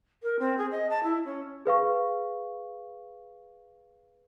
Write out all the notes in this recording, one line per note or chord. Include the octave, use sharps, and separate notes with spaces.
A#4
C4
G#4
D#5
A5
E4
C#4
G#4 B4 F5 C#6